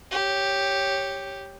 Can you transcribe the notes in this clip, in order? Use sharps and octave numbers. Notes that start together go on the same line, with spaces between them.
G4 C#5